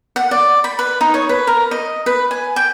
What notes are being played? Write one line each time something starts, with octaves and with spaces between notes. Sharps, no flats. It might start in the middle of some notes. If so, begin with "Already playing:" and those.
F#5
D5
B5
B4
D#4
C#5
B4
A#4
D#5
B4
G#5
G5